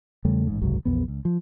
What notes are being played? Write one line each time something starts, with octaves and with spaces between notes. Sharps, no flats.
E2 C#3 G3 A3
A1 G#2
F#1 C2 G#2 F#3
A#1 E2 B3
C#2
F3